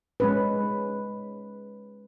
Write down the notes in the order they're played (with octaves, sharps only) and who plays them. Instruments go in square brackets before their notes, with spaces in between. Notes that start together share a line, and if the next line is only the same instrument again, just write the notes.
[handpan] G#3 C#4 B4